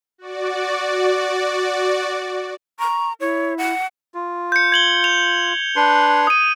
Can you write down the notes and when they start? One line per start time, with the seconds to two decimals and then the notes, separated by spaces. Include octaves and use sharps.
0.18 F#4 D5
2.79 A#5 C#6
3.20 E4 C#5
3.58 F#5
4.14 F4
4.52 G6 C#7
4.72 G#6 F#7 G7
5.04 F7
5.76 D4 B4 C6
6.27 D#6 D#7